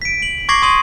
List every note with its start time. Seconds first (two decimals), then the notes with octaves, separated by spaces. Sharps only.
0.02 B6 D7
0.22 F#7
0.49 C#6 D6 G#6 A#6 C7 F#7
0.62 C6 D#6 D#7 F#7